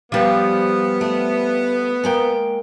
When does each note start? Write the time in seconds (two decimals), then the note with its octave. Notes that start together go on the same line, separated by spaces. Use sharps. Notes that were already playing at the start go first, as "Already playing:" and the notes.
0.12 F3 G3 B3
1.01 A3
2.04 G#3 A#3 G5